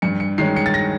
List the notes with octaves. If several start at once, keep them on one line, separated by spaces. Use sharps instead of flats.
G2 C#7
C#7
D#3 G#3 C#4 C7
C#7
A6
A#6